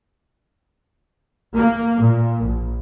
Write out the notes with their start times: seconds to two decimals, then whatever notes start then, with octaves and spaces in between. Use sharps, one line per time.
1.55 A#3
2.02 A#2
2.44 A#1